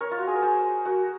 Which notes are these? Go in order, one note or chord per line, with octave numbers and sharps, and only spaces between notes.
A#4 C#5
F4
F#4
G#4
A#4
G#4 C5
F#4 A#4